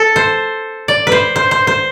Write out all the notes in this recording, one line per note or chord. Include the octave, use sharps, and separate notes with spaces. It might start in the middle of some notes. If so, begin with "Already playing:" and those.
Already playing: A4
C5
D5
B4 C5
C5
C5
C5